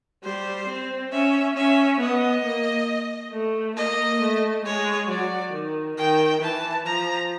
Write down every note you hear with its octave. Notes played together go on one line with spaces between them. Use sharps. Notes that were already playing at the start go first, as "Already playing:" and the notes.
G3 C5
C4
C#4 E5
C#4 E5
B3 D#5
A#3
A3
A#3 D#5
A3
G#3 C#5
F#3 D5
D#3
D#3 G5
E3 A5
F3 A#5